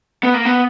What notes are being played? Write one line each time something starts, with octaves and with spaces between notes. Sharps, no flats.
B3
A#3
B3